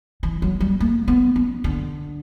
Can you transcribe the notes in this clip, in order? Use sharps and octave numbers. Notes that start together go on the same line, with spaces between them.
E3
F#3
G3
A#3
B3
C#4
D3